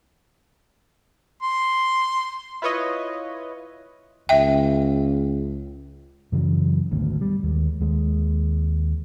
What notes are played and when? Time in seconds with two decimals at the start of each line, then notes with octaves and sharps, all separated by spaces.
1.42 C6
2.62 E4 F4 B4 C#5 D#5
4.29 C#2 E5 G5
6.32 F#2 C#3 E3 F#3
6.91 G#1 D2 B2
7.21 G3
7.43 D#2 G#3
7.80 D#2 G#3